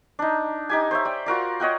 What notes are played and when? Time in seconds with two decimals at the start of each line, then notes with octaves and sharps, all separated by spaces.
0.19 D4 D#4
0.69 D#4 G4 G#5
0.91 C5 C#5 E5
1.05 D5 G5
1.26 F4 F#4 A#4 D5
1.60 C#5 D#5 F#5 G5